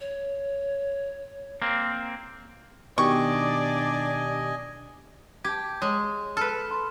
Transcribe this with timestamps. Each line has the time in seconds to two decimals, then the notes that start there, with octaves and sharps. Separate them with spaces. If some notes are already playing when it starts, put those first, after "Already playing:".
0.01 C#5
1.62 A#3 C4
2.98 B2 D#3 D4 G4 D5 D#5 G#5 C#6
5.45 G4 A5 G6 G#6
5.82 G#3 C#5
6.37 A4 B4 F6
6.71 B5 C6